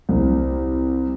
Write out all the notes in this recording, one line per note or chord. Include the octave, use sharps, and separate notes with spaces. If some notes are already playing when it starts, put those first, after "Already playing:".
C2